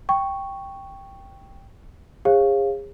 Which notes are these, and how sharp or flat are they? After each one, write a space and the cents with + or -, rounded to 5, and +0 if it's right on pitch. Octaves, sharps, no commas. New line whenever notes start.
G5 +0 C#6 +0
G#4 -40 C#5 -45 F5 +0